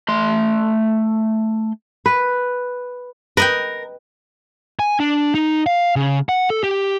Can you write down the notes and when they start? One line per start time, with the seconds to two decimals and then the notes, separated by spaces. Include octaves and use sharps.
0.08 A3 C6
2.06 B4
3.37 A#4 B4 D#5 G5
4.79 G#5
5.00 D4
5.35 D#4
5.66 F5
5.96 C#3
6.29 F#5
6.50 A4
6.63 G4